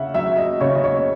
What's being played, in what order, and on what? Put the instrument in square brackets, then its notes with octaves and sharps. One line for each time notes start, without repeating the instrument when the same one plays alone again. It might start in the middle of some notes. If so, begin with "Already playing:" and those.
Already playing: [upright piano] C#3 E5 F#5
F#3 E5
D#5
C#3 C#5
D#5
C#5